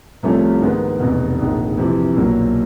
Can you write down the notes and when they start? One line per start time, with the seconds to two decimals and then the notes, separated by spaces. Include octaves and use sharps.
0.23 C2 C3 F3 A3 C#4
0.61 G#2 D#3 G#3 B3
1.00 F1 E2 B2
1.38 A#1 G#2 D#3
1.78 F2 C3 E3
2.16 B1 A#2 F#3